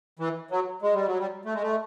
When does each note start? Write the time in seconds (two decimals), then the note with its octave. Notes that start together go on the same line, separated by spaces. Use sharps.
0.19 E3
0.51 F#3
0.82 G#3
0.94 G3
1.06 F#3
1.19 G3
1.45 A3
1.54 G#3
1.62 A3